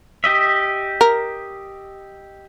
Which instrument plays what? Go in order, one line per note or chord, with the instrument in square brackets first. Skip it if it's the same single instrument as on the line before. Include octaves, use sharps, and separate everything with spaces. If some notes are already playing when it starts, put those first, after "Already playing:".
[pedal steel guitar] G4 D#5 E5
[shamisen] A#4